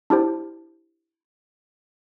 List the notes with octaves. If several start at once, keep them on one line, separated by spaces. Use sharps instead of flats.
D4 E4 G4 C5